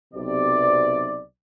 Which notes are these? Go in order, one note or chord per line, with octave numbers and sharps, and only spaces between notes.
B1 C3 D5